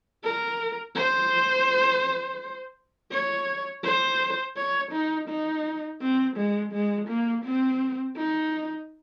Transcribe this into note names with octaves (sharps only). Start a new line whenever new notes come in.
A#4
C5
C#5
C5
C#5
D#4
D#4
C4
G#3
G#3
A#3
C4
D#4